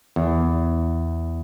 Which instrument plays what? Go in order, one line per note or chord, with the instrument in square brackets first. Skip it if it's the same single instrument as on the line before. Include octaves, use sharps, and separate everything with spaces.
[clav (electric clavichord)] E2